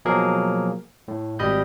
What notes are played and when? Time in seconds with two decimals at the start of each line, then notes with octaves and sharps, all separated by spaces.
0.05 B2 F3 F#3 A#3 G#4 A#4
1.08 A2
1.39 G#1 G3 D#5 B5 G6